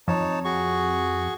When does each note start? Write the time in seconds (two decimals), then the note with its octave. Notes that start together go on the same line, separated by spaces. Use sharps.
0.08 F2 D#4 C#5 A5
0.44 F#4 G#4 C#6